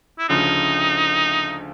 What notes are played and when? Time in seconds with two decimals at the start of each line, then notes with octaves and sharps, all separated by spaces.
0.19 E4
0.29 D2 C#3 F3 D#4